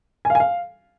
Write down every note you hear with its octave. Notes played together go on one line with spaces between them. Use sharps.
G#5
F5
G#5
F5